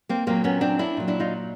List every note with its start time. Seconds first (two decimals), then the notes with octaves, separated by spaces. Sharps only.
0.09 A#3 C4
0.27 A#2 F#3 A#3 C4
0.44 B3 C#4
0.61 C4 D4
0.79 D4 E4
0.97 A#2 F#3
1.08 D4 E4
1.20 D#4 F4